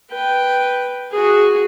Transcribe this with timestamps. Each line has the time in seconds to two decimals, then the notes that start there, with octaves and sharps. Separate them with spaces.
0.10 B4 G5
1.11 F#4 G#4